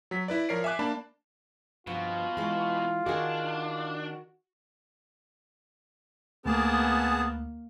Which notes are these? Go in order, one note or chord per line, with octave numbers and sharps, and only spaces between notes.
F#3 B6
E4 B4 D5
F3 A#4 C#5 D5 C7 D7
E5 G#5 D6 F#6
A#3 D4 A5 B5
G2 B2 F3 F4
E3 G#3
D#3 D4 D#4 F#4 G#4
D2 A#3 B3 G#4 A5